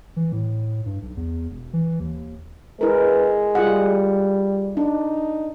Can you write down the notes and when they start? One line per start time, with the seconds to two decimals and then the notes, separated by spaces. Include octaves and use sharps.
0.16 E3
0.32 A2
0.86 G2
1.02 B1
1.17 E2
1.51 E1
1.73 E3
2.00 D#2
2.81 G#3 E4 A#4 B4
3.55 G3 F4 G#4 F#5
4.77 D4 D#4